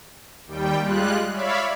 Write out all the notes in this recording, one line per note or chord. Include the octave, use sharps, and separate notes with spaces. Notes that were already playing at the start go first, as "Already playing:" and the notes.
D#2 G3 G5
G3 G#3 F4 F#6
C#5 D5 E5 F5 B5